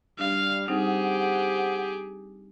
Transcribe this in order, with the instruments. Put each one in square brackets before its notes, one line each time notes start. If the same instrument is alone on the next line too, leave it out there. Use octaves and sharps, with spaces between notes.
[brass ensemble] G3 [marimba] D4 [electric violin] F5
[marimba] G3 C4 D#4 [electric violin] G4 G#4 [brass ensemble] C5 F#5